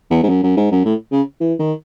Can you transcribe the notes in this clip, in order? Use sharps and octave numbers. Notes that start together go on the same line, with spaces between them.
E2
G#2
F#2
F#2
G#2
F#2
A2
C#3
E3
D#3